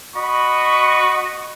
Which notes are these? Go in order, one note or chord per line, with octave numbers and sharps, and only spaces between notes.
F#4 D#5 B5 C#6